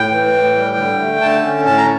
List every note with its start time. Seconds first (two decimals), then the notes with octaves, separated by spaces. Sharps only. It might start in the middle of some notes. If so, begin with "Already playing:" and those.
Already playing: A2 G5
0.11 E3
0.34 A2
0.55 G3
0.77 D3
0.99 A3
1.21 D3 A5
1.44 C#4
1.65 A2 A5
1.78 A#5